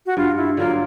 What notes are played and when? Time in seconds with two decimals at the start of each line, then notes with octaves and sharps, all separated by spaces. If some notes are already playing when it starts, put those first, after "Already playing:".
0.06 F#4
0.17 G2 F4
0.37 E4
0.57 D3 F#3 A#3 F4